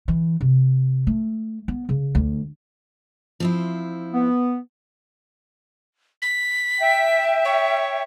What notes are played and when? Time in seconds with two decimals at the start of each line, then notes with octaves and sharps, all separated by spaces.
0.08 E3
0.41 C3
1.07 A3
1.68 B3
1.89 C#3
2.15 D2
3.40 F3 C4 E4
4.13 B3
6.22 B6
6.80 E5 G5
7.45 C#5